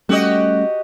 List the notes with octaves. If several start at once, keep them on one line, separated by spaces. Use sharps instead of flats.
G3 A3 C#4 F#4 G4 D#5